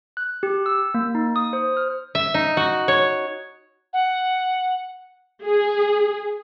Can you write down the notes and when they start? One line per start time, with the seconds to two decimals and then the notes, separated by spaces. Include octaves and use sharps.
0.17 F#6
0.43 G4
0.66 E6
0.94 A#3
1.15 D#4
1.36 D#6
1.53 C5
1.77 F6
2.15 E5
2.34 D#4
2.57 F#4
2.88 C#5
3.93 F#5
5.42 G#4